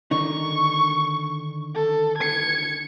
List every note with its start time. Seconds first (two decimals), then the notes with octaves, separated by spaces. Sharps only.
0.11 D3 D#3 D#4 C#6
1.75 A4
2.18 G#6 C#7